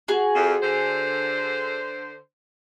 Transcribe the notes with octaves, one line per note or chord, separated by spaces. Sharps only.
F#4 G#4
F2
D3 C5